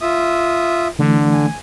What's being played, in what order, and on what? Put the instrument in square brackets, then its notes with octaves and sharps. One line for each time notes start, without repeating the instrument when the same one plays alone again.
[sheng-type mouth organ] F4 E5 D#6
[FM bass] D3 [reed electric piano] E3 A3
[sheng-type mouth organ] G#5